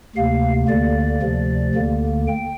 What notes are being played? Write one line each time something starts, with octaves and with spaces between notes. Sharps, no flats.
D2 C3 A#3 F5
D2 D3 A#3 D5
D2 C3 F3
D2 D3 A#3
G5